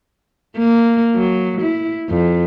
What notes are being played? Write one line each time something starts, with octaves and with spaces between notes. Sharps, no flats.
A#3
F#3
E4
F2